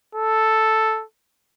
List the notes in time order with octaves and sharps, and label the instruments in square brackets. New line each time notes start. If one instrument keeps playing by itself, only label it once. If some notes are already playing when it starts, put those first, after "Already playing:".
[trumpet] A4